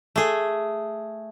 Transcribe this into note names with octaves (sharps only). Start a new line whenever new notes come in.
A3 G#4